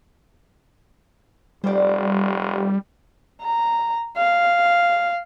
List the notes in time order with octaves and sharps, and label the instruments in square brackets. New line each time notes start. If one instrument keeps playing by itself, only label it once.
[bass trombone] F1 [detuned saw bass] G3 [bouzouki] C5 D5
[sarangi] A#5
F5